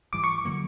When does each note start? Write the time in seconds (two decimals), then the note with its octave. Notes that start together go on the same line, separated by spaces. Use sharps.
0.13 G#2 E3 G3 D6
0.24 C#6
0.45 D3 F#3 A#3